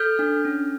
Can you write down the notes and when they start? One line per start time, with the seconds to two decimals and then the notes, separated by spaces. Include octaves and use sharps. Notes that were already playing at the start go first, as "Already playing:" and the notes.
Already playing: A4 F6 G6
0.19 D4
0.45 C#4